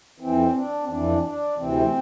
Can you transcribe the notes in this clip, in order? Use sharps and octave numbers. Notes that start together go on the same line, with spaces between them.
F2 E3 C4
D4
C4
F2 E3 D4
D4
D2 C3 E3 C4